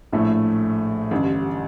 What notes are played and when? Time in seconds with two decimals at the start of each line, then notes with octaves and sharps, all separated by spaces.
0.12 A#1 A2 A3
1.11 A1 G2 D3